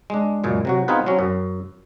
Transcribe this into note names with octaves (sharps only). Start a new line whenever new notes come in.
G#3 D4
C#2 F#2 A#2 G#3
C3 F#3 F#4
B3 C4 D#4 F4 G#4 B4
F#3 C4 C#4
F#2